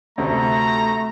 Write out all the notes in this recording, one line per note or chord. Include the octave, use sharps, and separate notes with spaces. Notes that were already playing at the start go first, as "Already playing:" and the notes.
D2 C3 A3 A#5